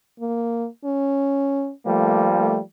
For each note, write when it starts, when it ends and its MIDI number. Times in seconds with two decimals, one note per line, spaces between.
0.20 0.68 58
0.85 1.72 61
1.86 2.63 53
1.86 2.63 55
1.86 2.29 57
1.86 2.63 58
2.39 2.59 57